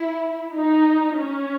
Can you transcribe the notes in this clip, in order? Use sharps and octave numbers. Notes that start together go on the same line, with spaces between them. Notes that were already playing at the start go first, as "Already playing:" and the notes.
Already playing: E4
D#4
C#4